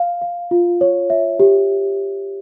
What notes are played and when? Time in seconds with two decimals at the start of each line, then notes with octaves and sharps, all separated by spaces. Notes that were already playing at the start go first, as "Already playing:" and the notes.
Already playing: F5
0.21 F5
0.51 F4
0.81 C#5
1.10 E5
1.40 G4